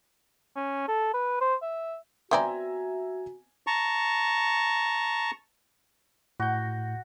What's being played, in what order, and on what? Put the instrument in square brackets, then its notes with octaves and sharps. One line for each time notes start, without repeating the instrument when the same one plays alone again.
[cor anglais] C#4
A4
B4
C5
E5
[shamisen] B3 C4 D5 [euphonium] F#4 [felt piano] E5 G#5 A#5
[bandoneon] A5 A#5 C#6
[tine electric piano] A2 G6 [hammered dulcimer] F#4